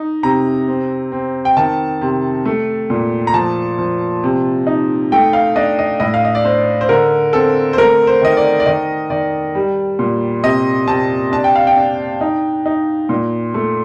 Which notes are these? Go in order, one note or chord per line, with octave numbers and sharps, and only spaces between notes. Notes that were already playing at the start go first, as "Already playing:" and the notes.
Already playing: D#4
C3 A#5
C4
C4
G5
D#3 A5
C3
A3
A#2
A#5
F3 A5
F3
C3
D#4
A3 G5
F5
D4 D#5
D#5
A2 D#5
F5
D#5
D5
D4 C5
C5
D3 A#4
C4 A4
C5
A3 A#4
C5
D#3 D#5
D5
D5
D#3 D#5
D#3 D5
G3
A#2
C3 D#5
C3 A5
D4 A5
G5
F5
G5
D4
D#4
D#4
A#2
A3